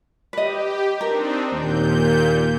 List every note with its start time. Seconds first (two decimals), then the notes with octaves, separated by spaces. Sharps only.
0.33 G4 B4 D#5
1.01 C4 D4 D#4 A#4
1.52 D#2 A#2 G6